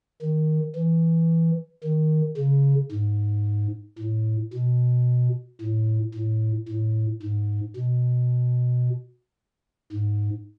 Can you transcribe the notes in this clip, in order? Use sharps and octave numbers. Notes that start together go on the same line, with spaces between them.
D#3
E3
D#3
C#3
G#2
A2
B2
A2
A2
A2
G#2
B2
G#2